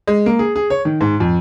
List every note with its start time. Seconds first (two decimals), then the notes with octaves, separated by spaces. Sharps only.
0.07 G#3
0.26 A#3
0.39 G#4
0.56 G#4
0.70 C#5
0.85 D#3
1.01 G#2
1.20 F2